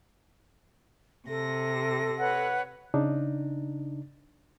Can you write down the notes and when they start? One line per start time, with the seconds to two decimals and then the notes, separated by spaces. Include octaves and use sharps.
1.29 C3 A4 A#6
2.19 B4 C#5 F#5
2.94 C#3 D4 D#4